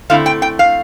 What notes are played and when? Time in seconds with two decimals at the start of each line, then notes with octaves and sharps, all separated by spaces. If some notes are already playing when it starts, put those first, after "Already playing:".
0.10 D3 A3 C4 E4 F5
0.26 G5
0.42 G5
0.59 F5